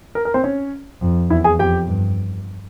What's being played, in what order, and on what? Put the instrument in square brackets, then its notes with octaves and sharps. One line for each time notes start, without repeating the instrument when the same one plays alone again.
[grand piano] A#4
A#4
C4 C5
C#4 C#5
[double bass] F2
[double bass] E2 [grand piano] E4 E5
[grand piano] G#4 G#5
[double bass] F2 [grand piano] G4 G5
[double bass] G2